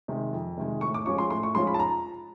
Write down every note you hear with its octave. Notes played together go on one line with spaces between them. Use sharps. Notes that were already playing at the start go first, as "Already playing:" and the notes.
C3 D#3 G#3
F2
C3 D#3 G#3
A2 C#6
D6
F3 G#3 C#4 F4 C#6
C6
A2 C6
C#6
F3 G#3 C#4 F4 C6
B5
A5
A#5